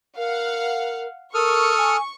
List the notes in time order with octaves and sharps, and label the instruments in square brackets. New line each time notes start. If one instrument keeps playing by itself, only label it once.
[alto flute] A#4 [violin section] F5 F#5
[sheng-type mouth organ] A4 D#6 F6 [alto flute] A#4 [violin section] C#6
[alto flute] G#5